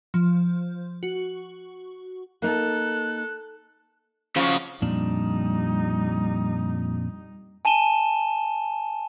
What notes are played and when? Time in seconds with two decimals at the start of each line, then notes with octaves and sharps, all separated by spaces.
0.14 F3
1.03 F#4
2.42 A#3 D#4 A4 F#6
4.36 C#3 F3 F#4
4.82 F2 A#2 G3 D4 D#4
7.65 G#5 A5 D#7 E7 G7